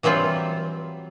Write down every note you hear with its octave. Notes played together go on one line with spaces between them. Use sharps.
E3 F#3 G3 C4 F4